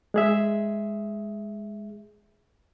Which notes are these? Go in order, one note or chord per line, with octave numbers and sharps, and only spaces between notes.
G#3 G#4 E5